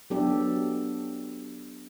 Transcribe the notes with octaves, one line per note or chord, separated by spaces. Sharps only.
F#3 B3 D4 G4 A4